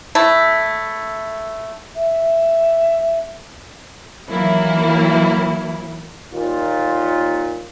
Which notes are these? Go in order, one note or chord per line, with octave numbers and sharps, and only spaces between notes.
A3 E4 A5
E5
D#3 E3 F#3 A#3 E4
D#2 A#2 F4